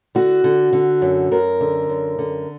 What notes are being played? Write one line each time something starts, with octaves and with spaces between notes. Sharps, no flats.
D3 F#4
D3
D3
F#2
F#2 A#4
D3
F#2
D3